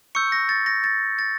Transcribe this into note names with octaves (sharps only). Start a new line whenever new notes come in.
C#6 E6 G6 C#7
A#6
A6
A#6
A6
A6